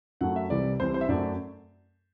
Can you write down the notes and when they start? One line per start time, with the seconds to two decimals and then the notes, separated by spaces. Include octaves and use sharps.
0.21 F#2 F#3 A3 F#5
0.36 E5
0.50 C2 C3 E3 G3 D5
0.80 C2 C3 E3 G3 C5
0.94 C5
1.01 E5
1.09 F#2 F#3 A3 D5